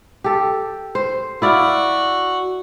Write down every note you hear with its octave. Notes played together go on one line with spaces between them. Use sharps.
G4 A4
C5
E4 F#4 D5 F5